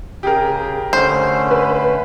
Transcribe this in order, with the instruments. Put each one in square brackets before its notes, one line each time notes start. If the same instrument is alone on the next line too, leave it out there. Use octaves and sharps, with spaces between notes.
[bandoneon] C#3 [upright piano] G4 G#4 A#4
[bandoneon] D3 A3 C#4 [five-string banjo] C5
[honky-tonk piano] B4